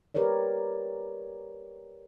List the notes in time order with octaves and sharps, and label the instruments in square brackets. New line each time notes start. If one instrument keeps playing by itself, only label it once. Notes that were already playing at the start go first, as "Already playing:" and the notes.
[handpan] G4 A#4 B4 C#5 D5